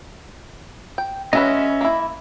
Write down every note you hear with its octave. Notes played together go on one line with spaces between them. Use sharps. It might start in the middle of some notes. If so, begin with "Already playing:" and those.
G5
F#3 G#3 C#4 B4 D#5 E5
A#3 E4